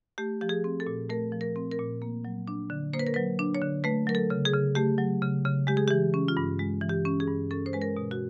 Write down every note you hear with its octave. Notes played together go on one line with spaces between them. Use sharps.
A3 G4
F3 G4
G#4
C4
A4
A#2
A3 A#4
F3
A#4
C4
A#4
A#2
A#3
F#3
D4
D3
A#3 C5
B4
A#4
F#3 B4
D4
C#5
D3
A3 B4
F#3 A#4
A4
C#3
G#4
C#3
A3 G4
F#3
C#3
C#3
G#3 G4
G#4
G4
E3
C#4
F4
G2
G#3
E3
G4
C#4
G#4
G2
C#4 A4
C5
G#3 B4
A#4
B2
F#4